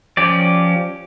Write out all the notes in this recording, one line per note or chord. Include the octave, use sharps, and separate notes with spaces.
F3 C#4 G4 D5